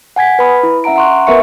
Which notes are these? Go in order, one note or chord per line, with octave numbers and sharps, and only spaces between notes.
F#5 G#5 G#6 B6
B4 B5 D#6
E4
C#4 E5 F#5 A#5 D7
F#5 A#5 C6 C#6 F#6
B3 A#4 B4 E5 C#6 C#7